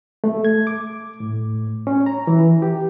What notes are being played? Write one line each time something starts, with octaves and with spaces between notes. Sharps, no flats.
A3
G#6
D6
A2
C#4
A#5
E3
G4